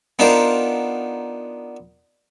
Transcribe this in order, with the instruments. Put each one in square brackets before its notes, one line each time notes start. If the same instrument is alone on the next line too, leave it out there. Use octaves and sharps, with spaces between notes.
[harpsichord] B3 D4 D#4 F4 A#4 C5